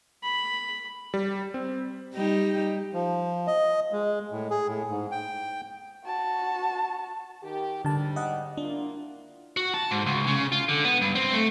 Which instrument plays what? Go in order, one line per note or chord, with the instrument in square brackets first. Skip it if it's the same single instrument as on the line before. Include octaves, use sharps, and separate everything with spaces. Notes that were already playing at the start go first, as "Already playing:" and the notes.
[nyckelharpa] B5
[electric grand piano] G3
C4
[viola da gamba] G3 D#4 G4
[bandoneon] F3
D#5
G#3
A2
G#4
A2
G#2
G5
[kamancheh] F#4 A5
[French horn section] D#3 G4
[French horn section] G#2 G3 [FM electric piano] D3 A5
[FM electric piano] D#5 F#5
[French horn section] A#3 E4 F4 [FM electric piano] D4
[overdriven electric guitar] F#4
A5
G#2
C#2
C#3
F4
D3
B3
G2
C4
A3